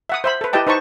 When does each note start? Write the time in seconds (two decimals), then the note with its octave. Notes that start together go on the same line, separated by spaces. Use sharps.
0.09 E5 F#5 D#6
0.24 C5 E5 B5
0.41 A4 B4
0.53 E4 G4 B4 D#5 G5 A5
0.67 D#4 B4 C5 A5 C#6